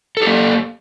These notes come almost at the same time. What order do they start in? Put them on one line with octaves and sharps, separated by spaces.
A4 G4 A#3